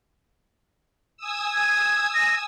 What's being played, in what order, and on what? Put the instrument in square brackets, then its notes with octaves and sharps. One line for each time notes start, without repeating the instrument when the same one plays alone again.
[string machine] G#5 D#6 E6
[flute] G#6
A#6